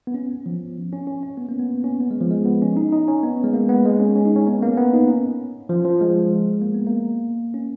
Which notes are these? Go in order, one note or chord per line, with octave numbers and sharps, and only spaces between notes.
B3
C#4
B3
F3
C#4
C#4
C#4
B3
A#3
B3
C#4
B3
G#3
F3
G#3
B3
C#4
D#4
D#4
C#4
B3
G#3
A#3
B3
G#3
C#4
C#4
D#4
C#4
B3
A#3
B3
D#4
C#4
F3
F3
G#3
A#3
B3
A#3
C#4